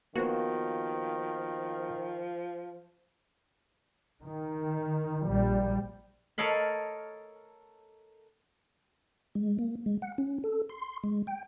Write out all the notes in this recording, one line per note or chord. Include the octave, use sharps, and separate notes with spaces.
D#3 F3 A#3 B3 F#4 C5
D#3
A#1 G3
A4 A#4 C#5 D#5 F5 B5
G#3
A#3
G#3
F#5
C#4
A4
C6
G#3
G5